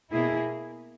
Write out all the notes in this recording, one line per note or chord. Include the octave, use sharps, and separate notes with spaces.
B2 A#3 E4 G#4